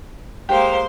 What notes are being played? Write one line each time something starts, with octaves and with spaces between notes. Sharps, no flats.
G#3 A#3 G4 C5